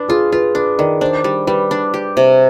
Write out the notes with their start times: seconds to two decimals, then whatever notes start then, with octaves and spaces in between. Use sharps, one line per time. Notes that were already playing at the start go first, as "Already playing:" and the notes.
Already playing: D4 B4
0.09 F4 G#4
0.32 F4 B4
0.55 D4 B4
0.78 D#3 D5
1.01 D4 C5
1.24 G3
1.47 G3 B4
1.71 D4
1.94 G4
2.17 C3